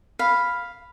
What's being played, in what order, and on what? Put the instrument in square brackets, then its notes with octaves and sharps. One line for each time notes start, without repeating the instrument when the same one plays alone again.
[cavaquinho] F5 B5